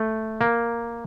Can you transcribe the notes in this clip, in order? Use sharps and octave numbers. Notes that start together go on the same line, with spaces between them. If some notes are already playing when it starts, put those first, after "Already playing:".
Already playing: A3
A#3